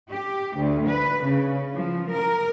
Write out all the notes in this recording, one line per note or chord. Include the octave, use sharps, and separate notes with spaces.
G4
D2
B4
C#3
F3
A#4